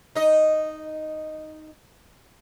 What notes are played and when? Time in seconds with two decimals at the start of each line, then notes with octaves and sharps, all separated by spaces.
0.15 D#4 D#5